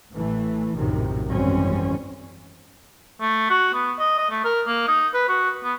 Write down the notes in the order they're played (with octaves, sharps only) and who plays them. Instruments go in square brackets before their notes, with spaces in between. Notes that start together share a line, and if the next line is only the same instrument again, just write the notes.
[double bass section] A1 A2 E3 A3
A#1 F#2 A2 C3 D#3
G#1 F#2 E3 G3 C4 C#4
[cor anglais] A3
F#4
B3
D#5
D#5
A3
A#4
A#3
D#4
B4
F#4
B3